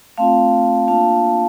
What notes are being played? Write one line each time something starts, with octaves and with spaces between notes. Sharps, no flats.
A3 C4 F4 F5 A5
A#3 D4 F4 F5 A5